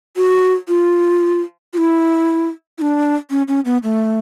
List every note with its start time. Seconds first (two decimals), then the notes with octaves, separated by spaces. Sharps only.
0.16 F#4
0.69 F4
1.74 F4
1.78 E4
2.78 E4
2.82 D4
3.30 C#4
3.48 C#4
3.65 B3
3.83 A3